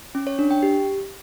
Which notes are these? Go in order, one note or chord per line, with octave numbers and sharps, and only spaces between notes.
C#4
C#5
D4
G5
G4